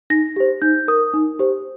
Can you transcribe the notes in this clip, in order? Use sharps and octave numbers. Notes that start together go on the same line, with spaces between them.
D#4 A#6
G4 C5
D#4 G6
A#4 D#6
D#4
G4 C5